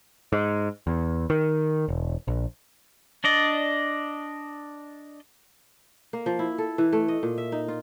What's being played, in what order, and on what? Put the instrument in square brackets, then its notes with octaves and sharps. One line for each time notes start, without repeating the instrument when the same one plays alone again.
[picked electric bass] G#2
E2
D#3
E1
A#1
[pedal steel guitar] D4 D5 D#5
[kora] A#3
F3
E4
A4
E3
A3
D#5
A#2
E5
D#4
F4